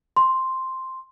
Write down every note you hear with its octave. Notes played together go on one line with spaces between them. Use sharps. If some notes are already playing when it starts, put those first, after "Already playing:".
C6